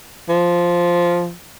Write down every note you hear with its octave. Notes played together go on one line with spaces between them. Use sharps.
F3